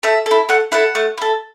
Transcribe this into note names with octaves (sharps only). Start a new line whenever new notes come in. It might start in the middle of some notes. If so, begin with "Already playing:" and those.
A3 E5
E4 A4
A3 F#5
E4 A4 F#5
A3
E4 A4